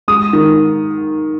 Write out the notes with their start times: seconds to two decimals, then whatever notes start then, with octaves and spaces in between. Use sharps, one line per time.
0.08 G#3 D#6
0.33 D#3